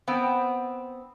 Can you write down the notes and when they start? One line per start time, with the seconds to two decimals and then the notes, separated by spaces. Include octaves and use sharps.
0.08 B3 C4 G5